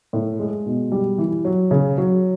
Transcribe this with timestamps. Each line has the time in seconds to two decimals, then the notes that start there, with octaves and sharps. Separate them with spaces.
0.13 A2
0.39 G#3
0.66 B2
0.92 G3
1.18 E3
1.45 F#3
1.71 C#3
1.98 F#3